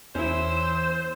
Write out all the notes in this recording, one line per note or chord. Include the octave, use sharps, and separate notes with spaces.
E2 C#4 E4 C5 E6